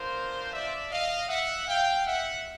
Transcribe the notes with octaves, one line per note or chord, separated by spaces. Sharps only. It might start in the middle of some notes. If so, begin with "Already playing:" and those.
Already playing: B3 D4 F4 A#4 C5
D5 E5
D#5 F5
E5 F#5
F5 G5
E5 F#5